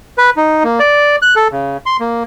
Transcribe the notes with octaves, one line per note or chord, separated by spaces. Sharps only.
B4
D#4
A#3
D5
F#6
A4
C#3
C6
A#3